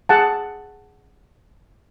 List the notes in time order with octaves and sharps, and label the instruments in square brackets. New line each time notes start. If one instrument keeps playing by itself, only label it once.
[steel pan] G#4 F#5 A5